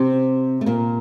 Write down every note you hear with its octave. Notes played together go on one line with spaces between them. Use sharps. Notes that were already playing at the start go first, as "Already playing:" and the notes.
Already playing: C3 C4
A3
A#2 A#3